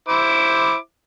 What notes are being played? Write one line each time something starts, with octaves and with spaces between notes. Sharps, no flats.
E4 C5 D6